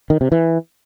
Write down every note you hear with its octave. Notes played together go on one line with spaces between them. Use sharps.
D#3
C3
E3